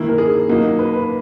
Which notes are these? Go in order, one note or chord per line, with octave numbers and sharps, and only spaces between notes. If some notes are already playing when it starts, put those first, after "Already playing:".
Already playing: D#3 A#3 E4
A#4
G#4
F#3 A#3 D#4
B4
B4